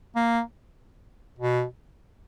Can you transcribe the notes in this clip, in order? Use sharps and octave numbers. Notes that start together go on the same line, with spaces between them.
A#3
B2